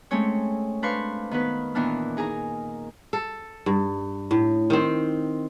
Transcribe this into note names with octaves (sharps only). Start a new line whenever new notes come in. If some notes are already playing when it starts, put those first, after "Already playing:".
G#3 A3 C4 C#4 C#5
D4 B4 C5 F5 C#6
D#3 B3 B4
A#2 D#3 E3 B3 D4 F6
D#4 G#4 A#4 A#5
A4
G2
A2
D#3 C4